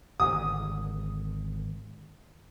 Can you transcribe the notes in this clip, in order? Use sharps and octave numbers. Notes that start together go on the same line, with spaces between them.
G#1 D3 D#6